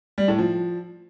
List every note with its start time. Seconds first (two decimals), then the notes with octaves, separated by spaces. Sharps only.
0.18 G3
0.28 A2
0.39 F3